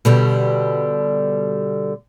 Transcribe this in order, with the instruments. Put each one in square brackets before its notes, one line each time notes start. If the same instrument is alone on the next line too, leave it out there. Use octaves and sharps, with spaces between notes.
[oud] B2 D3 G3